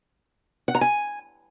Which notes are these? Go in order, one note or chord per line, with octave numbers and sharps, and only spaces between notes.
F#5
A#5
G#5